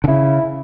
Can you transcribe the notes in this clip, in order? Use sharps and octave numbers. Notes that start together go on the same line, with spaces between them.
D3
C#3 E4